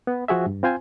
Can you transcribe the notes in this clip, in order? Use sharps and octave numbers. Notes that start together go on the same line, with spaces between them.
B3
F3 F#4 G#4 E5
G2
C4 F4 C5 G#5